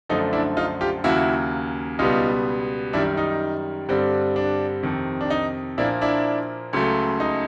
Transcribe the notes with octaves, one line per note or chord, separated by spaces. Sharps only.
F#2 D3 F3 A3 D#4
D4 E4
D#4 F4
F4 G4
D#2 C#3 F#3 A#3 E4 F#4
C#2 B2 G3 B3 D#4 F4
F#2 D#3 G3 D4 E4
D#4
G2 D3 G3 C4
D4
F2 C3 D#3
D4
D#4
A#2 F3 A#3 D4 E4
D4 E4
C#2 C#3 F#3 A3
D#4